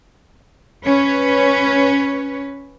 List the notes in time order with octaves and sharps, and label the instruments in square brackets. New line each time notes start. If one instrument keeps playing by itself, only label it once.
[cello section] C#4 B4 C#5